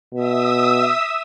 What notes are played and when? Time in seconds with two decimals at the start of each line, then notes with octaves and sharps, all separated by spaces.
0.14 B2 E5 D#6 E6